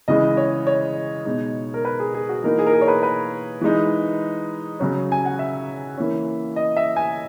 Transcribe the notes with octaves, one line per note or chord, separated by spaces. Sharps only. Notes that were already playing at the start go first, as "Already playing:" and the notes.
C#3 E3 G#3 D#5
C#5
C#5
B2 G#3 D#4
A#4
B4
G#4
G#4
F#4
E3 A#3 D#4 A#4
G#4
A#4
G#4
C#5
B4
B4
E3 G#3 D#4
C#3 F#3 C#4
G#5
F#5
E5
E3 A#3 C#4
D#5
E5
G#5